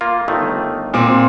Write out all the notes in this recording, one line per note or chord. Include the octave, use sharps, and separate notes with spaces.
A#3 F4
G1 D#3 A3
A#2 C4 D6